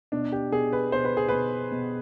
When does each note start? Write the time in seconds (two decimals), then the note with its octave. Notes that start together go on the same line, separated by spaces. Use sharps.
0.12 B2 D4
0.32 G4
0.52 B2 G#4
0.73 B4
0.92 B2 C5
1.04 B4
1.17 G#4
1.28 B2 B4
1.72 B2